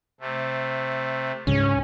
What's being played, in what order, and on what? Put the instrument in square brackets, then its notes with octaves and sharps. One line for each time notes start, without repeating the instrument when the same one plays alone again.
[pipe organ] C3 A3
[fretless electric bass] C#2 G#2 C#3 [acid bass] C#4